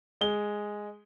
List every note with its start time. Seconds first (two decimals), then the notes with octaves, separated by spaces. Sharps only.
0.21 G#3 G7